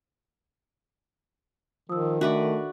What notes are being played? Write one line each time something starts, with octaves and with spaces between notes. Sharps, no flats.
D#3 F3 D#6 E6
A3 D4 F#4 A4 B4 D5 E5